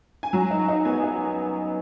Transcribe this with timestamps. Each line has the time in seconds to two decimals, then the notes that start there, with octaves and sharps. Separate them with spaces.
0.23 G#5
0.33 F#3 A#5
0.50 D#4
0.59 A#5
0.68 D#4
0.85 B3 G#5
1.03 D#4